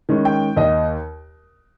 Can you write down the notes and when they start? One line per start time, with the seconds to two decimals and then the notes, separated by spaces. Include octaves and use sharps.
0.09 D#3 G#3 C#4
0.25 G5
0.56 D#2 D#5